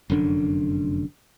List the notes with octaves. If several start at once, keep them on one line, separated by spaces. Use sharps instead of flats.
F1 F#2 D3 D4